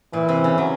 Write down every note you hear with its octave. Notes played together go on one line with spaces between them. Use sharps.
A#2 E3
C3
C#3
F#3